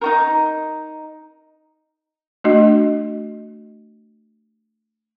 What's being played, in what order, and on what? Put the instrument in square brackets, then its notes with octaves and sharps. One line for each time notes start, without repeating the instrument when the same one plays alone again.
[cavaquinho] D#4 F#4 A#4
[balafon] A3 D4 F#4 D#5